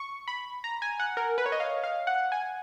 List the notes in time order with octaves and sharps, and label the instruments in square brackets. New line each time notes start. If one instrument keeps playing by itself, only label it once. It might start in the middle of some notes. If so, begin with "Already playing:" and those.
Already playing: [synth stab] C#6
B5
A#5
G#5
F#5
A#4
B4
C#5
D#5
F5
F5
F#5
G#5